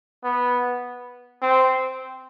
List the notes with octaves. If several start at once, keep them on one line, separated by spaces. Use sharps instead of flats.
B3
C4